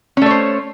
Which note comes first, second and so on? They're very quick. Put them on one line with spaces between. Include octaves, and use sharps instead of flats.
C#4 A3 C#5 C5